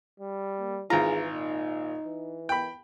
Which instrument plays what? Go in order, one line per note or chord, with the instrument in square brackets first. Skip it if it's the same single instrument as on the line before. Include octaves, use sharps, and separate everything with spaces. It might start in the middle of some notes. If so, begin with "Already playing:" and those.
[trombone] G3
[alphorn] A#3
[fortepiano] G#1 F4 [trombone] E3 [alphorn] G#4 [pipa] A#5
[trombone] A#2 [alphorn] D#4
[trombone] E3
[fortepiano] G5 B5